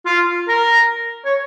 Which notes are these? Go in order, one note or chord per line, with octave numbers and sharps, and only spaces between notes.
F4
A#4
C#5